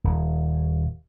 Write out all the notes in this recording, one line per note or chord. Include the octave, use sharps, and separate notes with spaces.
D#1